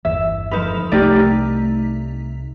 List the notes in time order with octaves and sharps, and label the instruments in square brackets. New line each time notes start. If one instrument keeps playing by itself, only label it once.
[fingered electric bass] G1 E2 [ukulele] E5
[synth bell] F3 A4 F7 [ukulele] D#4 B4
[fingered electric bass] C2 [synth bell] A3 D#4 B6 [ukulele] G4 A#4 D5